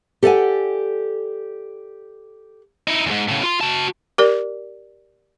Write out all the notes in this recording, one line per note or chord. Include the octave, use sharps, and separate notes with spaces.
G4 A4 D5 D#5 F#5 G#5
D#4 E4
E2 G#2
A2 C#3
F4 C6
F#4 A5
G4 A#4 D5